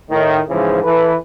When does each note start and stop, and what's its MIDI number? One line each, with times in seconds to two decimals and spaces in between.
0.10 0.39 45
0.10 0.39 51
0.49 0.79 44
0.49 0.79 49
0.49 0.79 52
0.49 0.79 53
0.84 1.15 52
0.84 1.15 69
0.84 1.15 71